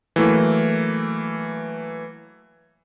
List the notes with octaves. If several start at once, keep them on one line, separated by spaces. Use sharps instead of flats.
E3 F#3 A3 A#3